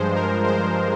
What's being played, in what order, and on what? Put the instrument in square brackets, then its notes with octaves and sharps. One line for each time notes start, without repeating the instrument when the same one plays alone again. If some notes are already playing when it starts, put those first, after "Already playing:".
Already playing: [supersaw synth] G2 F3 G#3 C5
A#4
C5